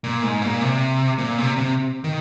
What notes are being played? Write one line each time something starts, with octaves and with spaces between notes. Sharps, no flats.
A#2
G#2
A#2
C3
A#2
C3
C3
D#3